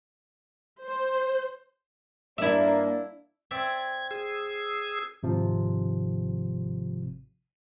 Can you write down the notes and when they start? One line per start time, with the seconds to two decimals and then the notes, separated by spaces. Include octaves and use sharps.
0.82 C5
2.38 G2 A#3 D4 E4 E5
3.51 C4 D5 E5 G#6
4.11 G#4 E6
5.23 G#1 C3 F3